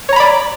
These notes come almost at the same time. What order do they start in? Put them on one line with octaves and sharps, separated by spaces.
C#5 A#5 B5 D5